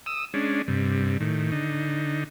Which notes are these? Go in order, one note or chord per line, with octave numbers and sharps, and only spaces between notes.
D#6 E6
G#3 C#4 D4
G2 C3
A2 D#3
D3 D#4